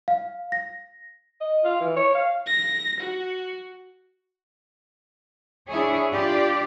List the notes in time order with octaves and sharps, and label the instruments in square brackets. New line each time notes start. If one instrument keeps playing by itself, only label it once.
[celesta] F5
A#6
[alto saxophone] D#5
F4
E3
C#5
F5
[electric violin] A#6
F#4
[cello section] D4 E4 G#4 C#5
D4 F4 G4 D5